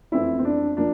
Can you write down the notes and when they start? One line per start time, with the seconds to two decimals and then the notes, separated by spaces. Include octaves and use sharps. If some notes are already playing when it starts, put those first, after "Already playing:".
0.12 F2 E3 A3 C4 E4
0.39 C4
0.45 D4
0.77 F3 A#3 D4